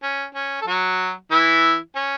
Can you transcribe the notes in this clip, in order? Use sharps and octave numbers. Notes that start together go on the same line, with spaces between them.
C#4
C#4
A4
F#3 F#4
E3 E4
C#4